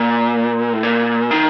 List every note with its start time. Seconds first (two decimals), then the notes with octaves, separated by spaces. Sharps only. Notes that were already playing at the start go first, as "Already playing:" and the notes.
Already playing: A#2
0.73 A2
0.83 A#2
1.31 D#3